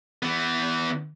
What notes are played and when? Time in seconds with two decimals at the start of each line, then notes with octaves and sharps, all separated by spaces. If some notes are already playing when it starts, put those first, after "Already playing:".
0.23 E3 B3